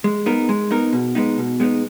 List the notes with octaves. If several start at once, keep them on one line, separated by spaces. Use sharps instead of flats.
G#3
B3 D#4 A#4
G#3
B3 D#4 A#4
B2
G#3 B3 D#4
B2
G#3 B3 D#4